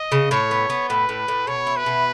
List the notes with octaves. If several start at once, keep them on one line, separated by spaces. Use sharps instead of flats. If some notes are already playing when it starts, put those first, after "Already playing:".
Already playing: D#5
C#3
A2 C#5
B3
B3
A2 B4
A2
A2
B2 C#5
E4
B4
B2